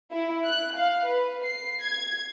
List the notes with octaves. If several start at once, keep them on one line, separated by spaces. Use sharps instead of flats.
E4
F#6
F5
B4
C7
G#6